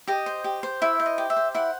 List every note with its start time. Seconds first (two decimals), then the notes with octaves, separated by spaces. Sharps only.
0.08 G4 D#5
0.26 C5
0.44 G4
0.63 C5
0.82 E4 E5
1.00 C5
1.06 D#5
1.18 G4
1.30 E5
1.36 C5
1.55 E4 F#5